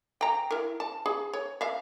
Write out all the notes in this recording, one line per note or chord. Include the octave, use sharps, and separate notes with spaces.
G5 A#5
E4 A#4
A5
G#4
C#5
E5 F5